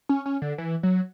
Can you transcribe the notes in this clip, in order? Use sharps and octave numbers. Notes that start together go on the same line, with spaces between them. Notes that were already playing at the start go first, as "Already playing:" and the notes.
C#4
C#4
D3
E3
F#3